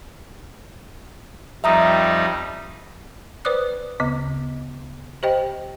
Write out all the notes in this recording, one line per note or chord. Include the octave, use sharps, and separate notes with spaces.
F2 G3 D#4 E5 A#5 D#6
B4 C5 D5 D6 D#6 F#6
D2 C#3 B3
G4 C5 D#5 G5